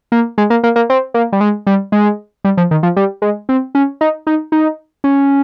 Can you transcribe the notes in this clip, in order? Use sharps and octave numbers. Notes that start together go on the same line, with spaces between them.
A#3
G#3
A#3
A#3
A#3
C4
A#3
G3
G#3
G3
G#3
G3
F3
D#3
F3
G3
G#3
C4
C#4
D#4
D#4
D#4
C#4